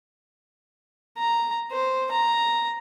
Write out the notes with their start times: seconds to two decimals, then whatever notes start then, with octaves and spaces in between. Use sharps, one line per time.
1.18 A#5
1.71 C5
2.11 A#5